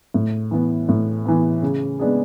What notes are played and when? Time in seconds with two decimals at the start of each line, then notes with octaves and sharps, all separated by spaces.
0.14 A2
0.51 E3 B3
0.89 A2
1.25 E3 B3
1.62 C#3
1.99 G#3 B3 D4 G#4